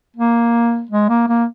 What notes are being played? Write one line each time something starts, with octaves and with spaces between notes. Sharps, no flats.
A#3
G#3
A#3
A#3